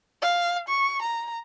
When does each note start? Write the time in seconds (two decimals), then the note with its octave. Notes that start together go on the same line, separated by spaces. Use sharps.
0.22 F5
0.69 C#6
1.02 A#5